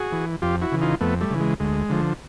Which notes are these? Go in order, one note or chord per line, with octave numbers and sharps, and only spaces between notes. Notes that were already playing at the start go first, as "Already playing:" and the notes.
Already playing: F#4 G#4
E3
F2 F4 G4
E4 F#4
C#3 E3
D#4 F4
F2 A3 B3
G3 A3
C#3 E3
G#3
D2 G#3
D3 F3